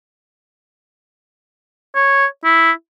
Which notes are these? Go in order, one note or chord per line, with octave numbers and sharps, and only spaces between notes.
C#5
E4